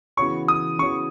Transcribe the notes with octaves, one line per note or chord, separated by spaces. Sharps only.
C#3 E3 B3 F#4 C#5 C#6
D#6
C#3 E3 B3 F#4 C#5 C#6